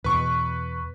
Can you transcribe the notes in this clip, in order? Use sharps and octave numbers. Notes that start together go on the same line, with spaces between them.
E2 B2 B4 C#6